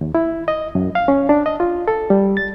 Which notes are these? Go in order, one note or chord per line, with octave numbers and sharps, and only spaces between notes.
D#2
E4
D#5
F#2
F5
C#4
D4
D#5
F4
A4
G3
A6